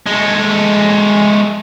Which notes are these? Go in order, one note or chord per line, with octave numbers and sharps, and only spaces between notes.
G#3 A3